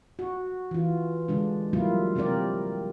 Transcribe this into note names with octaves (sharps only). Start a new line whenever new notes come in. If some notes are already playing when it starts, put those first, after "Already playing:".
F#4
E3 F4
D3 G#3 D4
D3 F#3 G3 A#3 E4 F4
C3 C4 G4 A#4 D5